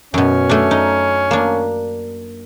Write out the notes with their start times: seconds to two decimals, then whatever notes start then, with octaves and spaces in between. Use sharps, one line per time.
0.14 F#2 B2 C#4
0.49 A3 D4
0.71 D#4
1.31 A#3 D4